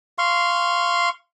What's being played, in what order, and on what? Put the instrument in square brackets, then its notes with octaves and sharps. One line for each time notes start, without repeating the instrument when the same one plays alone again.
[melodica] F5 C6 C#6